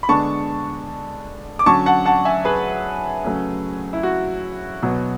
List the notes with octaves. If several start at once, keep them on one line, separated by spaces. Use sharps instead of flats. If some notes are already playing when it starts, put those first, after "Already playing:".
B5
D3 G#3 B3 D4 A5 C#6
D6
D3 F#3 C#4 A5 C#6
F#5 A5
F#5 A5
E5 G#5
G#4 B4
C#3 F#3 A3 C#4
E4
F#4
B2 F#3 B3